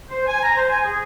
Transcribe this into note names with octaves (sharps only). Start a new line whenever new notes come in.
C5
G#5
A#5
C5
G#5
G#4